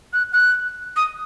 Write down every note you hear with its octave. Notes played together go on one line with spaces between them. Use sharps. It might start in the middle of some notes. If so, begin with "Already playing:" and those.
F#6
F#6
D#6